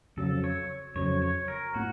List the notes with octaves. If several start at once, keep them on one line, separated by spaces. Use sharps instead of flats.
F2 C#3 F#3 A4
C#5
F2 C#3 F#3 C#5
C#5
A#4
A2 F#4